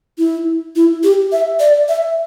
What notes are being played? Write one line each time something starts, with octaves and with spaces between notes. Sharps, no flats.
E4
E4
G4
E5
D5
E5